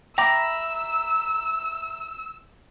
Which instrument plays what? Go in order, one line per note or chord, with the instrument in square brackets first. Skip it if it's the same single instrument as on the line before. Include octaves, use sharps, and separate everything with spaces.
[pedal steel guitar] E5 A#5 B5 [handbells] G5 D6 [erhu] E6 [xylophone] A#6